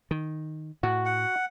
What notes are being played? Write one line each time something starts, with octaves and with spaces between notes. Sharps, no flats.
D#3
A2 F#4
F#5